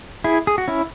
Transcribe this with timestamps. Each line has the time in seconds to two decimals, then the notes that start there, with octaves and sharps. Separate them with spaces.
0.24 E4 G#4
0.47 G#4
0.58 F#4
0.68 C#4 E4